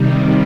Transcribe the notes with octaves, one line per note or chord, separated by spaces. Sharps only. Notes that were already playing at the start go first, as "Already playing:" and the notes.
Already playing: C3 D#3 G3